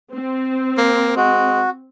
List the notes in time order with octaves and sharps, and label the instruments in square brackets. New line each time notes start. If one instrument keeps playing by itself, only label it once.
[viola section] C4
[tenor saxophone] A#3
[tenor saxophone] G#3 [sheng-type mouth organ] F#4